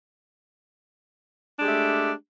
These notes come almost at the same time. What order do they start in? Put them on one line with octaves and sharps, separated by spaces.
D4 G#3 G4 A3